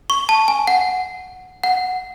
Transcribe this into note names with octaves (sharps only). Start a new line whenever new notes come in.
C#6
A5
G#5
F#5
F#5